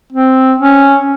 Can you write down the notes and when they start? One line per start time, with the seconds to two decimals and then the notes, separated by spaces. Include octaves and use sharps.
0.12 C4
0.58 C#4